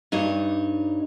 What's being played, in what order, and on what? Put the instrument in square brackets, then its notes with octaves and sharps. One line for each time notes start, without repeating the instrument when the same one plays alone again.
[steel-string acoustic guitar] G2 D4 D#4 C#5